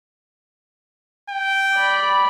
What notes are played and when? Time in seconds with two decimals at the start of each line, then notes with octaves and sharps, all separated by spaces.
1.30 G5
1.74 D5 B5